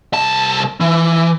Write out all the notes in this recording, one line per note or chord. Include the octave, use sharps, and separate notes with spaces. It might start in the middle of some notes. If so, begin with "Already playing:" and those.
C2 A5
E3